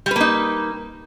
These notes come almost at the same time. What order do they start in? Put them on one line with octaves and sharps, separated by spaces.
G3 B4 A#3 D#4